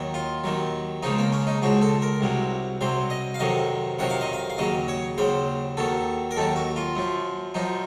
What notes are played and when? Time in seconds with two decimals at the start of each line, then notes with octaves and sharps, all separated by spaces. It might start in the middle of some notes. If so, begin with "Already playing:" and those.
Already playing: D#2 D#3 F#3
0.14 F4
0.44 D#2 D#3 F#3
1.03 C#2 C#3 F3 D#4
1.18 A#3
1.32 C#4
1.47 D#4
1.62 C#2 C#3 F3 F#4
1.82 A4
2.02 A#4
2.21 C2 C3 F#3
2.81 C2 C3 F#3 C5
3.10 D#5
3.34 F5
3.39 F2 C3 D#3 F#3 D#5
3.99 F2 C3 D#3 F#3 F#5
4.10 F5
4.21 D#5
4.33 F5
4.50 F5
4.58 D#2 C#3 F#3 D#5
4.88 C#5
5.18 D#2 C#3 F#3 C5
5.77 D#2 D#3 F#3 A4
6.31 A#4
6.36 D#2 D#3 F#3 A4
6.56 F#4
6.76 F4
6.96 F#2 F3
7.54 F#2 F3 D#4